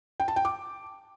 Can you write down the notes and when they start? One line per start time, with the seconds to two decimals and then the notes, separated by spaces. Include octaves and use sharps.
0.20 G5
0.28 A5
0.36 G5
0.45 D6